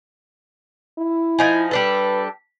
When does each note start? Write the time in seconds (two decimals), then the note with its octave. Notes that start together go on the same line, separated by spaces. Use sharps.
0.98 E4
1.39 F3 D#4 G#5
1.71 G3 D4 A4 B4